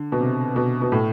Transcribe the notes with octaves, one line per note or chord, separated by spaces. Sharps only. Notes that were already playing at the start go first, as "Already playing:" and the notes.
Already playing: D3
B2
C3
B2
B2
A2